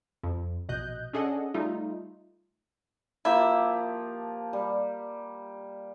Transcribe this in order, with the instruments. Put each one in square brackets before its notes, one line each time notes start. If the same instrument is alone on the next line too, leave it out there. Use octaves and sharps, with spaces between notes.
[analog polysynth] F2
A#1 B2 D#5 F#6 G6
C#4 D4 G#4 A4 D#5 F#5
G3 A3 D#4 F4
[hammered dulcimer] F3 A#3 G4 [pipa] E4
[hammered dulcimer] G3